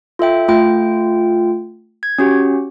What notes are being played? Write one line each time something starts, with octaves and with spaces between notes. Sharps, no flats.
F4 A4 E5 G5
A3 F4 G5
G#6
C#4 F#4 G4